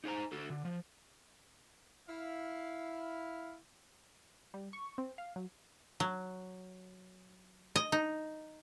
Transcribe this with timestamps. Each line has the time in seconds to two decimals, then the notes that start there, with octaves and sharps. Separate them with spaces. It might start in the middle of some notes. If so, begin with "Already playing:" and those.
0.04 D#4 G#4 C5 A#5
0.32 D3 F#4 A4
0.50 D3
0.65 F3
2.08 E4 F5
4.54 G3
4.73 C#6
4.98 C4
5.18 F5
5.36 F#3
6.00 F#3
7.76 D#5
7.92 D#4